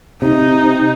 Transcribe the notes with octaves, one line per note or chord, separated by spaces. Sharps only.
C3 D#4